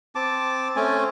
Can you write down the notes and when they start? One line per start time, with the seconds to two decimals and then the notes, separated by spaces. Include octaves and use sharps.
0.15 C4 A5 D6
0.76 A3 C4 C#4 G#5